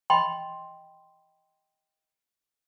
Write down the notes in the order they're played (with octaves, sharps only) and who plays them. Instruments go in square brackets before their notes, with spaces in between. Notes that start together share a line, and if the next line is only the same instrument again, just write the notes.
[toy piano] D#5 G5 B5 C6